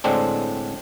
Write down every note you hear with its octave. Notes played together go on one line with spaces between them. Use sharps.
A2 D3 G#3 C4 D4